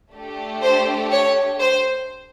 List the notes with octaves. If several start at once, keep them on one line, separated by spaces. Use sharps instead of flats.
A3 D4 G4
C5
C#5
C5